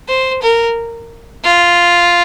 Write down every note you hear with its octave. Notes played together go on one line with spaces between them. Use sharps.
C5
A#4
F4